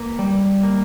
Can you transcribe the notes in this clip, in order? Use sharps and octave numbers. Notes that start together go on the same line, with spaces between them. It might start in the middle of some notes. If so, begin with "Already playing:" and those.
Already playing: A#3 B4
G3
A#3